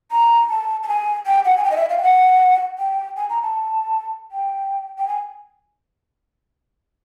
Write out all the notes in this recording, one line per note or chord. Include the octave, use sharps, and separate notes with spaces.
A#5
A5
A5
G#5
G5
F#5
G#5
G5
D#5
E5
F5
G5
F#5
G5
G#5
A#5
A5
G5
G5
G#5